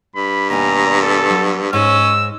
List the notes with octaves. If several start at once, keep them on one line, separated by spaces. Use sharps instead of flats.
G2 B5
D#2 B2 G#5 A#5
A4
F#3
G#2 G#3 C#4 C#5 E6